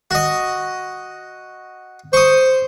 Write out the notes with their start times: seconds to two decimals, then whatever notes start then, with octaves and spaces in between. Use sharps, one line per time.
0.11 F#4 D#5
2.13 C5 C#6 D#6